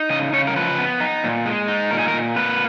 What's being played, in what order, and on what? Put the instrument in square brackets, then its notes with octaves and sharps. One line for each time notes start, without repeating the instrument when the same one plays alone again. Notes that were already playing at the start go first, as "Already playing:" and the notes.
Already playing: [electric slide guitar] D#4
C#3 D#5
C#3 C#5
A#4
F3 B4
B3
D#4
A#2
G#3
D#4
A#2 A#4
G#4
A#4
A#2
A#3 B4